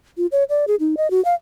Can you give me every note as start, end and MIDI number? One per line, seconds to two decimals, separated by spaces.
0.17 0.26 65
0.32 0.44 73
0.49 0.65 74
0.68 0.75 68
0.80 0.95 63
0.97 1.10 75
1.11 1.23 66
1.25 1.34 77